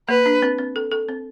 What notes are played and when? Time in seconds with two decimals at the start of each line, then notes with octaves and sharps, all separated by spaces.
0.09 A#3 B4
0.26 D4
0.42 C4
0.58 C4
0.76 A4
0.91 A4
1.09 C4